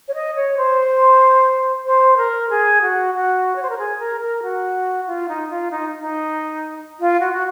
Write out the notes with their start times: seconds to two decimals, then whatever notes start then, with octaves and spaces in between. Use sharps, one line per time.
0.08 C#5
0.14 D#5
0.36 C#5
0.57 C5
1.86 C5
2.17 A#4
2.50 G#4
2.82 F#4
3.14 F#4
3.56 C#5
3.62 C5
3.70 A#4
3.78 G#4
3.99 A#4
4.21 A#4
4.43 F#4
5.07 F4
5.29 D#4
5.49 F4
5.71 D#4
5.98 D#4
7.00 F4
7.20 F#4
7.33 F#4